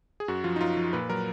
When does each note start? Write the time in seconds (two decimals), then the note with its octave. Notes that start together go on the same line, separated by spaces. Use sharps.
0.20 G#4
0.28 F#2 F#4
0.44 F3 F4
0.56 D#4
0.61 F#2 F4
0.77 F3
0.93 A#2 B4
1.10 F#3 A#4